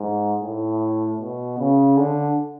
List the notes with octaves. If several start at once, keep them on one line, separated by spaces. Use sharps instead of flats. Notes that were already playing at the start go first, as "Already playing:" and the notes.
Already playing: G#2
A2
B2
C#3
D3